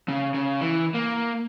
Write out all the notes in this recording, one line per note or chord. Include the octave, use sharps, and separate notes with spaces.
C#3
C#3
E3
A#3